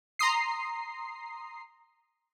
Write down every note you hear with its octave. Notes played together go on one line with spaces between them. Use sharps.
A#5 C6 D#6 C7